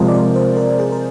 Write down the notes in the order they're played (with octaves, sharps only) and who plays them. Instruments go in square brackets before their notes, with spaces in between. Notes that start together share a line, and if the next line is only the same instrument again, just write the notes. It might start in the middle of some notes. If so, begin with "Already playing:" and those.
Already playing: [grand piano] C3 F3 G#3 [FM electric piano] A#4
[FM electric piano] D5
C5
C5
A#4
G#4
A#4